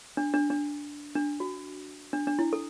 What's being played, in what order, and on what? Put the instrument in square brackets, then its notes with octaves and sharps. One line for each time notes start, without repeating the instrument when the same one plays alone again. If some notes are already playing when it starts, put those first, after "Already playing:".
[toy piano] D4
D4
D4
D4
F#4
D4
D4
E4
A4